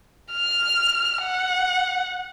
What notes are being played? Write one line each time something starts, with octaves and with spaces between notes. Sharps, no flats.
F6
F#5